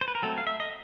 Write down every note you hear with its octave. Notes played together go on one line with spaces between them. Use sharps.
C5
B4
A#4
F#3 A3 C4 A4
F5
E5
D#5